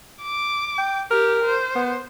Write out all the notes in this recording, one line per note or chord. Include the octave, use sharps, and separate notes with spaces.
D6
G5
G4 A#4
C5
B3